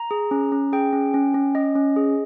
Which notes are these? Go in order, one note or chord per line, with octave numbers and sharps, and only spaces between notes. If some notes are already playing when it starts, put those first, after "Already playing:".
Already playing: A#5
G#4
C#4
C#4
G#4 G5
C#4
C#4
C#4
C#4 D#5
C#4
G#4